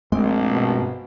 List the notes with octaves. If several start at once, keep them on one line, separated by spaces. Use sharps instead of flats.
A#1 G2 G#3 A3 C4
B2